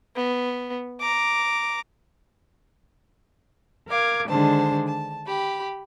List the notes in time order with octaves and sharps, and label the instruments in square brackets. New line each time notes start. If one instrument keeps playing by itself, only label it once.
[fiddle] B3
A#5 D6
[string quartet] A#4 F5 D6 G#6
D3 D#3 G#3 D4 C5 A5
A5
G4 B5